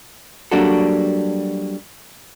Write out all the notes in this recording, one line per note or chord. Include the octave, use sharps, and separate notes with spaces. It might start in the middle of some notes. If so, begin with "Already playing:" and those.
F#3 G3 A#3 D4 F#4 A4